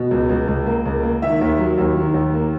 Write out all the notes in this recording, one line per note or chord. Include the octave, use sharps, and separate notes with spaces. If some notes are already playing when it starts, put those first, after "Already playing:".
Already playing: B2
C#2
C#2
C#2
A#3
C#2
A#3
D#3 E5
D#2
F#3
D#2
D#3
D#2
A#3